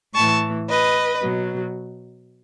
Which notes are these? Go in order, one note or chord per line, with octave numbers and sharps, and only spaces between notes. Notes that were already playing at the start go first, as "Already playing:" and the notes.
A2 E3 A5 C#6
B4 D#5
B2 F#3